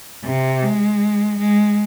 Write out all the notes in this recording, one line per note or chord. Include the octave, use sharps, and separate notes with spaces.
C3
G#3
G#3